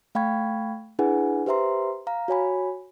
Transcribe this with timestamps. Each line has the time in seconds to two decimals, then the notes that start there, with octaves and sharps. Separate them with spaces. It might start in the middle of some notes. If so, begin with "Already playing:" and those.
0.15 A3 F5 G5 B5 C#6 G#6
0.99 D4 E4 G#4 B4 F#5 G#5
1.46 G4 B4 C5 E5 A#5 C6
2.07 F5 A#5
2.28 F#4 C#5 G#5 B5